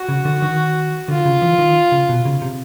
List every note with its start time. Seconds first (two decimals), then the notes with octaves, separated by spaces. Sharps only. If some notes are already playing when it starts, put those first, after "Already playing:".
Already playing: F#4
0.09 C#3
0.25 D3
0.42 D#3
1.08 D3 F4
1.25 C#3
1.42 E3
1.59 D#3
1.92 C#3
2.09 B2
2.25 C#3
2.42 C3